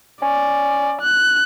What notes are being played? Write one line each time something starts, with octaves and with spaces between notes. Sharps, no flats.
C#4 D5
F#6